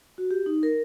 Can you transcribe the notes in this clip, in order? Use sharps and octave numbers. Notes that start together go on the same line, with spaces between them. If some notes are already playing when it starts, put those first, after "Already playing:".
F#4
G4
D#4
A#4